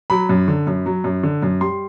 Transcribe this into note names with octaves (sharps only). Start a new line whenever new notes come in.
F#3 B5
F#2
D3
F#2
F#3
F#2
D3
F#2
G3 C6